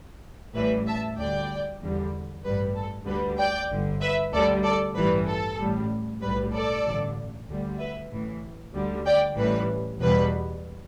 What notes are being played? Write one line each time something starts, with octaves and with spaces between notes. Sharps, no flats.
A1 A2 E3 G3 B4 E5
E5 A5
D2 D3 G3 D5 G5
E2 D3 G3
A1 G2 G3 B4
A4
D2 D3 G3 B4
D5 G5
G1 G2 D3
B4 E5
D2 D3 G3 A4 D5
A4 D5
A1 G2 E3 G3 B4
A4
A1 A2 G3
B1 A2 G3 B4
A4 D5
A1 G2 D3
D2 D3 G3
B4 E5
A1 A2 E3
D2 D3 G3
D5 G5
A1 A2 E3 G3 B4
E2 B2 G3 B4